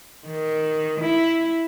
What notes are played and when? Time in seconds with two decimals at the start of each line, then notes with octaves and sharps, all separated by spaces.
0.26 D#3
1.01 E4